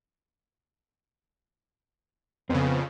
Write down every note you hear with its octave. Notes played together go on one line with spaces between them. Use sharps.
F2 C#3 B3 C4